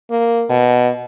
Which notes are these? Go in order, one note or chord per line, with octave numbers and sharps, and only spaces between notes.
A#3
B2